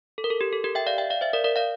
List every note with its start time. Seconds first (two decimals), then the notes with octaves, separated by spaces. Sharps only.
0.18 A4
0.24 A#4
0.30 A4
0.41 G4
0.53 A4
0.64 G4 A#4
0.75 E5 G5
0.87 D5 F5
0.98 E5 G5
1.10 D5 F5
1.21 C5 E5
1.33 A#4 D5
1.44 A#4 D5
1.56 D5 F5